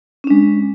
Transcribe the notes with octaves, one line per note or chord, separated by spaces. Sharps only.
G#3 C#4 D4